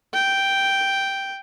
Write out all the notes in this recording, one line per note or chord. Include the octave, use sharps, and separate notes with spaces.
G5